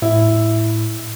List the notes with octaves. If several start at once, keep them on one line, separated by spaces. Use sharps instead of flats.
A2 E4